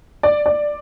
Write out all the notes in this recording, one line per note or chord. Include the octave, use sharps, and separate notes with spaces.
D5
D5